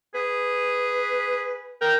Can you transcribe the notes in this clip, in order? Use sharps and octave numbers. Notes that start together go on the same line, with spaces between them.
G#4 B4
A#4 G5